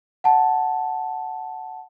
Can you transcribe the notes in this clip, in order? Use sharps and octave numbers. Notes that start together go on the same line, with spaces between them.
F#5 A5